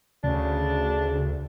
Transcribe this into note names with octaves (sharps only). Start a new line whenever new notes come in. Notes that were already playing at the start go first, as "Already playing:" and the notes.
D2 C#3 D4